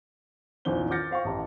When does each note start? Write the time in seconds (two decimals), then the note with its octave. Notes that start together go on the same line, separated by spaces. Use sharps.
0.65 A#1 E2 D#3 C#4 C5 G7
0.91 D6 F6 G6 A6 A#6 C#7
1.11 C5 F5 G5 C#6
1.25 A1 G4 A5 A#5